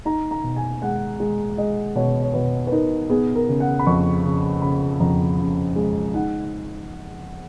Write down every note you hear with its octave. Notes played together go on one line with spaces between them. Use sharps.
D#4 A#5
A#5
B2
G#5
G#3 F#5
G#3
G#3 D#5
B2 C#5
C#5
B2 B4
B4
D#4 A#4
B3 G#4
A#4
C#3
F#5
B5
F2 C#6
C#3
C#3 B5
F2 A#5
C#3
G#3
D#4 F#5